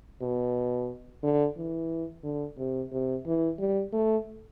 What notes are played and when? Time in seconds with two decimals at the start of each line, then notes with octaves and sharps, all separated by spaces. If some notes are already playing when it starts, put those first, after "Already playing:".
0.22 B2
1.23 D3
1.57 E3
2.23 D3
2.58 C3
2.92 C3
3.26 E3
3.59 G3
3.93 A3